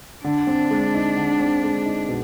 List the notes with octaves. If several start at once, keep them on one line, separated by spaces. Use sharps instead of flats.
D3 D4
C4
G#3
D#4
D3
C4
G#3
D#4
B2